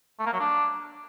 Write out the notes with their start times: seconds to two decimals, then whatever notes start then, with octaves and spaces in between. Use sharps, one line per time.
0.19 A3
0.26 A#3
0.33 F#3
0.39 D4